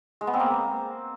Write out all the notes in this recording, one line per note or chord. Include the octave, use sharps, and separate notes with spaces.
G#3
B3
C4
A#3